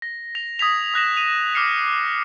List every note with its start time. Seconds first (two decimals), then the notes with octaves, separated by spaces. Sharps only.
0.02 A#6
0.35 A#6 F7
0.59 D#6 G#6 B6 F7
0.94 D#6 F#6 A#6 E7
1.17 D#7 F7
1.54 D6 F6 C7 C#7 F7